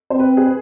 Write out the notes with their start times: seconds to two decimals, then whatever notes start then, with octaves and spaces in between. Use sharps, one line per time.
0.10 C4 C5
0.19 B4
0.37 G#4
0.46 B4